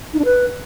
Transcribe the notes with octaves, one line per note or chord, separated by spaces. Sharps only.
D#4
D4
B4